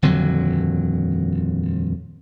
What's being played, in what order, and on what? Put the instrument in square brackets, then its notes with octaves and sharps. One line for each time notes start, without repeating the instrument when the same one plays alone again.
[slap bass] D#1 F2 D3 F#3